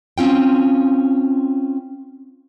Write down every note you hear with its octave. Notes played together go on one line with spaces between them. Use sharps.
C4 C#4 F4 G5